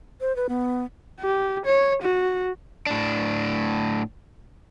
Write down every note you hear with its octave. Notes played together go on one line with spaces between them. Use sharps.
C5
B4
B3
G4
C#5
F#4
A2 D4